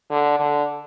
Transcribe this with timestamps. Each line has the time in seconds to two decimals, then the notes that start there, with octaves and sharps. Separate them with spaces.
0.11 D3
0.40 D3